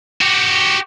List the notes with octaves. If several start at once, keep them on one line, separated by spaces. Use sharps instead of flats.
F#4 G4